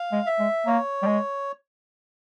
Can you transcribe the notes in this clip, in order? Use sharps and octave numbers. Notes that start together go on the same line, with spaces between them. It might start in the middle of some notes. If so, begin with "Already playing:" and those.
Already playing: F5
G#3
E5
G#3
A#3 C#5
G3
G#3